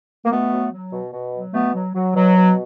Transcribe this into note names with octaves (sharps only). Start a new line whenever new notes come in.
A#3
B2 A3 B3
F#3
F#3
B2
B2
F#3
B2 A3 B3
F#3
F#3
B2 F#3
B2